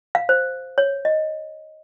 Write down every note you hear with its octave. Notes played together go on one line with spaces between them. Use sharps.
F5
C5
C#5
D#5